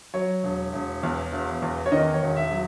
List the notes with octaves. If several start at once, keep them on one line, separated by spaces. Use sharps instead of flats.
F#3 C#5
E1
E1
E2
E1
E2
C#5
D#3 D#5
C#5
E1
E5
F#3